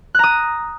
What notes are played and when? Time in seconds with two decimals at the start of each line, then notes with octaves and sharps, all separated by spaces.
0.15 F#6
0.19 A#5
0.24 D#6